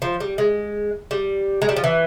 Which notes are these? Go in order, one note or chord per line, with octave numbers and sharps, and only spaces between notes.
F3
G3
G#3
G3
G#3
G3
F3
E3